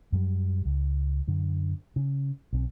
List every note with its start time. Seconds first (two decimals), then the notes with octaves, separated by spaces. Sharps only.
0.12 F#2 F#3 G3
0.65 C#2
1.28 F#2 D3
1.96 C#3
2.53 B1 C4